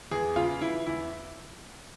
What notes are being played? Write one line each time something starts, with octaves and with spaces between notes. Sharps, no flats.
E2 G#4
C#3 F4
E3 E4
E2 E4